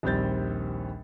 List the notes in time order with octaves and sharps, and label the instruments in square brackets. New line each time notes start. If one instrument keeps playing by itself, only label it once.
[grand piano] A#1 D#2 G3 C4 G6 A6